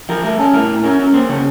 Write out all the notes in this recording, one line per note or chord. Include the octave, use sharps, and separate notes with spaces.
F3 A#4
A3 A#4
C#4 A4
A2 A#4
A2
C#4 A#4
C#4
A#3 C5
C#3 C#5